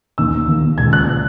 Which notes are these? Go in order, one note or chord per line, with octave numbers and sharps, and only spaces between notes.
D#2 D#3 A#3 E6
D#2 D#3 A#3
C#2 C#3 G#3 B3 G#6
F#6
C#3 G#3 B3